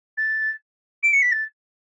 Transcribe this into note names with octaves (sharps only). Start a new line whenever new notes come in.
A6
D7
C#7
B6
A6